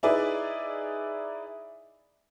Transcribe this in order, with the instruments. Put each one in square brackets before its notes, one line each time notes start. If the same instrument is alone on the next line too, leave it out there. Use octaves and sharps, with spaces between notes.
[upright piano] D#4 E4 G#4 B4 D5